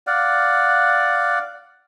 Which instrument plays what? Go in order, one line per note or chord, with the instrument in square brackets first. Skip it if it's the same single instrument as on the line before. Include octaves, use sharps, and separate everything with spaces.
[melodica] D5 F5 F#5